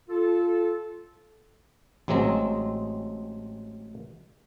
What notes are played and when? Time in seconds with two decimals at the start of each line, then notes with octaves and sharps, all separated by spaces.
0.09 F4 A4
2.08 A1 F#3 G#3 C4 A#5